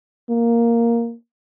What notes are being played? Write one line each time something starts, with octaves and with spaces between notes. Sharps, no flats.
A#3